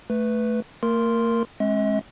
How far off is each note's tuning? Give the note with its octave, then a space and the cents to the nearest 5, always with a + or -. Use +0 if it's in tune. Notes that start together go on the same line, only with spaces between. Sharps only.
A3 +0 B4 +0
A#3 -45 A#4 +0 C6 +0
G#3 +10 C4 +45 D#5 +45